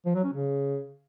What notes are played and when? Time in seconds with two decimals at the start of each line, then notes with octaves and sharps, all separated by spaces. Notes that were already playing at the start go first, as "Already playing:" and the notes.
0.06 F3
0.15 F#3
0.24 C#4
0.33 C#3